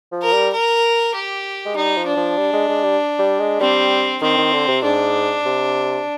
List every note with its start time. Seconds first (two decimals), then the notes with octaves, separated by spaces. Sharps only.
0.12 F3
0.22 A#4
0.33 G3
0.53 A#4
1.15 G4
1.66 G#3
1.76 G3 D#4
1.97 F3
2.06 D4
2.17 F3
2.38 G3
2.53 G#3
2.69 G#3
2.84 G3
3.19 G3
3.40 G#3
3.61 G3 C4
4.21 D#3 C4
4.38 D#3
4.53 D3
4.68 C3
4.83 G#2 D4
5.45 C3